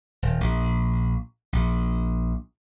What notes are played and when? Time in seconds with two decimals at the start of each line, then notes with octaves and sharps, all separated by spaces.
0.22 D#1
0.41 A#1
1.53 A#1